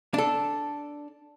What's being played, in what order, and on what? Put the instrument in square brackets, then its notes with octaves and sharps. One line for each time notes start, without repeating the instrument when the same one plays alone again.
[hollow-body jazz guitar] D4 A4